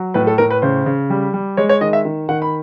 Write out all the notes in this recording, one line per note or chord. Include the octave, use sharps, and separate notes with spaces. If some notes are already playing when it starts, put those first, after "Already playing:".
Already playing: F#3
A2 B4
A4
A2 A#4
B4
C#3 C5
C#3
G3
G3
G#3 C#5
C#5
D#3 D#5
E5
D#3
D#3 F#5
B5